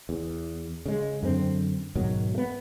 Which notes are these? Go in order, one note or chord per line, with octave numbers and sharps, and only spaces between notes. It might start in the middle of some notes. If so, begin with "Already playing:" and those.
E2
C#3 G#3
F#2 D3 C4
G#2 B2 D#3 F#3
A3 B3